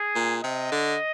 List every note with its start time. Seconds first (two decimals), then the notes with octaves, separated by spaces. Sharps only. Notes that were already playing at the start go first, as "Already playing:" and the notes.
Already playing: G#4
0.16 A#2
0.43 C3 D#5
0.72 D3